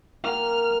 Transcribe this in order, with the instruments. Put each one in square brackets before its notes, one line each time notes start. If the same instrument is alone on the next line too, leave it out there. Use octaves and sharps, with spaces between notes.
[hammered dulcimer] A#3 F#5 G5 [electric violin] F6